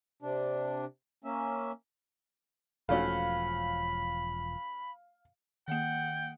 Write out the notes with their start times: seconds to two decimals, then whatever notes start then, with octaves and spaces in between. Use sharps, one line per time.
0.22 C3 D4
1.24 A#3 C#4 E5
2.89 E1 F3 A3 C#4 F#4 F5 B5
5.68 D#3 A#3 F#5 G5